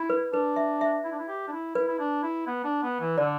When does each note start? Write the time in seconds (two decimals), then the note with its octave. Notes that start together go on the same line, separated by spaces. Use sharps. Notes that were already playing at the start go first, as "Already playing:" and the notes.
Already playing: E4
0.10 B4
0.33 D4 B4
0.56 E5
0.81 E5
1.04 E4
1.12 D4
1.19 E4
1.28 G4
1.47 D4
1.52 E4
1.75 E4 B4
1.88 E4
1.99 D4
2.23 E4
2.47 B3
2.64 D4
2.82 B3
3.00 E3
3.18 D3 D5